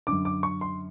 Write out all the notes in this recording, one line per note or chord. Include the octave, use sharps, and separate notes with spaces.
F#2 D3 D6
D6
C#6
C6